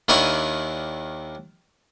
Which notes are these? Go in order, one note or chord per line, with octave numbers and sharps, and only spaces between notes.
D#2 D#3 D4 E4 C#6 D#6